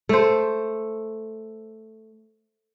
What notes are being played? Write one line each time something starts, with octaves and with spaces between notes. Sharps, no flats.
A3 C5